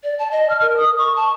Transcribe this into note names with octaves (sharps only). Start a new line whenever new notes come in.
D5
A5
D#5
F6
A#4
D#6
C#6
A5